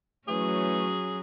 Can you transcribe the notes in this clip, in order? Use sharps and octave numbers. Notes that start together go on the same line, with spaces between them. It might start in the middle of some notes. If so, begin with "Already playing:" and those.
E3 F#3 A3 C#4 G#4